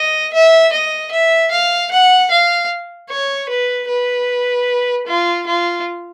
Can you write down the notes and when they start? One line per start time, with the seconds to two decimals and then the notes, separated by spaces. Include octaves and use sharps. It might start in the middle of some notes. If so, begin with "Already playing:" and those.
Already playing: D#5
0.33 E5
0.72 D#5
1.12 E5
1.51 F5
1.91 F#5
2.31 F5
3.10 C#5
3.49 B4
3.88 B4
5.07 F4
5.47 F4